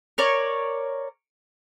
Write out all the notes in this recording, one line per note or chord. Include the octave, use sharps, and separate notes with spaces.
A#4 C#5 D5